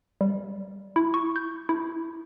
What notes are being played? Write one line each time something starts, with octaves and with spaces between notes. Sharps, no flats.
G3
E4
C#6
G6
E4